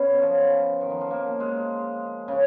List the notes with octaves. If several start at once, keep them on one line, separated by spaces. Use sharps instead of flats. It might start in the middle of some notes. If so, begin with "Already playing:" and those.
Already playing: B3 C#4
F3 F#3
D#3
F3
F3
A#3
G#3
C#3